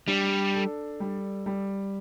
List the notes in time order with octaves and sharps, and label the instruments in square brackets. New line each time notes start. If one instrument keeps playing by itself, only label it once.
[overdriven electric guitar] G3 [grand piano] D4
[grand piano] A4
G3
G3